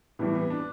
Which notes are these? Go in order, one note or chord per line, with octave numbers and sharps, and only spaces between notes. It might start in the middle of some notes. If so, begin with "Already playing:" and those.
A2 E3 G3 B3
B3
D4